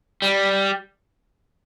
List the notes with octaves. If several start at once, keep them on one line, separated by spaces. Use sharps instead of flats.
G3